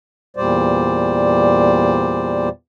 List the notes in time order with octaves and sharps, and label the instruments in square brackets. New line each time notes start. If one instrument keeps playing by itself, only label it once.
[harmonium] E2 A#2 G3 C5 D5